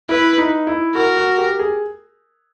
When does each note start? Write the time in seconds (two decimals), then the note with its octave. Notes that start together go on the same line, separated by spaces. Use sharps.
0.09 E4 B4
0.38 D#4
0.67 E4
0.95 F#4 A#4
1.17 F#4
1.38 G4
1.59 G#4